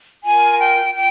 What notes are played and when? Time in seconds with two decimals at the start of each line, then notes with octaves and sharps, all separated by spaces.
0.22 F4 A#4 G#5
0.58 G5
0.94 F4 G5